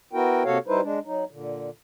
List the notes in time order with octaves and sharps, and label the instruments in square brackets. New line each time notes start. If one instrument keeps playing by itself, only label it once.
[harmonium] B3 E4 F#4 A#4 G5
C3 A#3 F#4 A4 C#5 F5
G3 D#4 E4 B4 C5
G#3 D4
F#3 D#4
A#2 D3